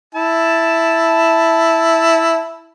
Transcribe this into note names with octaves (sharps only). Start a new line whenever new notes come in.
E4 A5